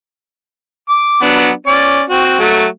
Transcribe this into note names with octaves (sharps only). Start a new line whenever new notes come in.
D6
F#3 B3 D4
C#4 D5
C4 F#4
F#3 A3